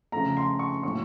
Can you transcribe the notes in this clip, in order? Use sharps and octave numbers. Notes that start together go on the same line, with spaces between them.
C#3 F3 A3 A#5
C6
C#6
A2 F#3 A#3 C#6